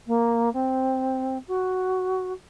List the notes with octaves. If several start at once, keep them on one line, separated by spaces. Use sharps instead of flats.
A#3
C4
F#4